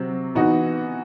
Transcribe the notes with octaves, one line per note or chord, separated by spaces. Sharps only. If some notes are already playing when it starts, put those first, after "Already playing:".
Already playing: C3 F#3 C4
E3 B3 D#4 F#4